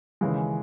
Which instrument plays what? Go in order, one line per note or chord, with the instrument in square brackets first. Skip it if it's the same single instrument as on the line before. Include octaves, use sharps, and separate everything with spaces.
[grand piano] D#2 C#3 E3 G#3